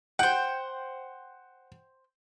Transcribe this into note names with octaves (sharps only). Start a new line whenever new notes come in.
C5 F#5 G5